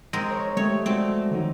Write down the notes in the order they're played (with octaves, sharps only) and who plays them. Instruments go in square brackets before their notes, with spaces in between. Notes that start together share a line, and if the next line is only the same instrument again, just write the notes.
[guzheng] G#3 C4 A#4
[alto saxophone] C#5
[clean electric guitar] G#3 G4 [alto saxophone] A3 [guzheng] C#5
[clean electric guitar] G#3 F#4 D5 [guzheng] C4
[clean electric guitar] D#3 F3 D#4 [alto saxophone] F#3